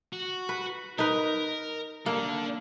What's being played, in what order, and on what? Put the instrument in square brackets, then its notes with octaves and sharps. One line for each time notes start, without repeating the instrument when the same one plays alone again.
[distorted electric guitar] F#4
[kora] B4
[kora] D#4 B4 [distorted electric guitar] A#4
[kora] A#3 [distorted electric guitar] D4 A4